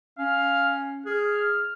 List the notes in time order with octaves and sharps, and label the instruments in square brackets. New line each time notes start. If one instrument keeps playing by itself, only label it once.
[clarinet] C#4 [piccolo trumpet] F5
[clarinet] G#4 [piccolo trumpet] F6